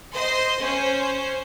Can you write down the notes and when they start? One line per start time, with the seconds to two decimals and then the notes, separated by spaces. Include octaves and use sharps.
0.14 C5 D#5 C6
0.63 C#4 C5